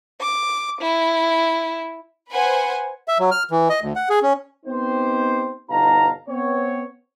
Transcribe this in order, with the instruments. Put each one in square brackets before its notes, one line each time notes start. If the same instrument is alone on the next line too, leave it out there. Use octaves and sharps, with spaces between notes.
[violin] D6
E4
[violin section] B4 C5 F#5 G#5
[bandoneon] E5
F#3
F6
E3
D#5
D2
F#5
G#4
C#4
[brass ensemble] B3 C4 D#4 G4 C5
G1 B2 D#4 F5 A5 A#5
B3 C4 C#5